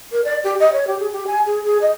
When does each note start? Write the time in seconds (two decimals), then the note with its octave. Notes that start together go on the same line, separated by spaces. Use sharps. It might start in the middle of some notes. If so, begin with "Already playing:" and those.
0.12 A#4
0.24 D5
0.44 G4
0.60 D#5
0.73 C#5
0.87 G4
1.00 G#4
1.12 G4
1.27 G#5
1.46 G#4
1.64 G#4
1.82 D#5